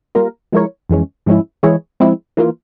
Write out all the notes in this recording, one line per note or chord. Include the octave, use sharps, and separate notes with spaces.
G3 A#3 F4 A#4
F3 G#3 E4 A#4 C#5
F2 E3 G#3 C#4
G#2 F3 G#3 C#4 E4
E3 G#3 E4 G#4 C#5
F3 G#3 C4 E4
E3 A#3 F4